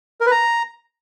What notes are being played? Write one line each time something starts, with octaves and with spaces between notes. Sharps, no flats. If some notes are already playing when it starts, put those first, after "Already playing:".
A#4
B4
A#5